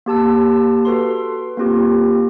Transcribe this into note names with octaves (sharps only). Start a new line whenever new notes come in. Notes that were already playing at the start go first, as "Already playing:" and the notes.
A#3 G4 A5 E6
F#4 A4 B4 C6
A#3 C4 F4 G4